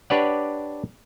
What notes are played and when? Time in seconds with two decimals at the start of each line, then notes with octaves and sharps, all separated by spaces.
0.10 D4 G4 B4 C#5 D5 F#5